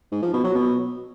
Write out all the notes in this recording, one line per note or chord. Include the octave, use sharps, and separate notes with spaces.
G#2
F3
B2
F#3
B2